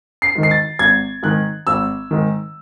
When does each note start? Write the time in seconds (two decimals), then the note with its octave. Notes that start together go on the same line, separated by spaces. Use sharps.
0.22 C7
0.35 G#2 D#3
0.43 C7
0.51 A6
0.79 G#1 G#6
1.23 G#2 D#3 F#6
1.67 G#1 E6
2.11 G#2 D#3